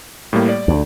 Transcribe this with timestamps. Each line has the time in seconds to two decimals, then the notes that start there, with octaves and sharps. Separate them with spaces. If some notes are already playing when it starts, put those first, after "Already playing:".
0.33 A2 G3 A#3
0.49 D5
0.68 D2